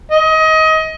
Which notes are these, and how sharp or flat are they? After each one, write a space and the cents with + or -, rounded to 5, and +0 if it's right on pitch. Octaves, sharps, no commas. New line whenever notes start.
D#5 +25